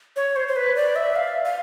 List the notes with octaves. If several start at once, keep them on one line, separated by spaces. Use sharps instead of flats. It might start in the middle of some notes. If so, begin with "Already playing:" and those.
C#5
C5
C5
B4
D5
E5
F5
F5